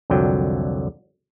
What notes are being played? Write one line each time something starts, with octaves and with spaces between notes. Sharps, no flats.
C2 F2 D3 F#3 G5